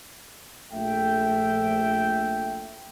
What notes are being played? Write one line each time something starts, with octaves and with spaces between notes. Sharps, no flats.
A#1 A3 E5 G5